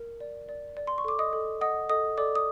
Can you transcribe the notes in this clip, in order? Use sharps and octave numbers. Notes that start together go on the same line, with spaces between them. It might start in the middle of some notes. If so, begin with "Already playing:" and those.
Already playing: A#4
D5
D5
D5
C6
C#6
A4 D6
D#5 D#6
A4
D#5 F#5 D#6
A4 D#5 D#6
A4 D5 D6
D#6